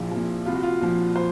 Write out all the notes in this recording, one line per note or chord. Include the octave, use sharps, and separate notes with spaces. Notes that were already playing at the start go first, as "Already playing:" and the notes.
Already playing: A#1 A#2 F3 E4
A#2 F3
C2 F4
F#4
F4
A#2 F3
C5